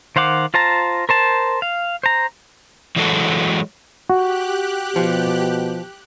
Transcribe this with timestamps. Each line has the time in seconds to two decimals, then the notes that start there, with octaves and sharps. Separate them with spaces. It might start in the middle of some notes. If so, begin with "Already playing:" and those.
0.16 D#3 C5 F5 F#5 D6
0.54 F4 C5 A5 A#5
1.09 A#4 C5 A5
1.62 F5
2.03 C5 A#5
2.96 E3 F#3 G#3 F#4 A4
4.10 F#4 G4 F#6
4.96 B2 F3